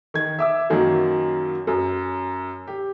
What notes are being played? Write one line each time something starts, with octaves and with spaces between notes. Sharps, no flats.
D#3 G#6
E5 D6 E6
F#2 D#3 F#3 A#3
F#2
G4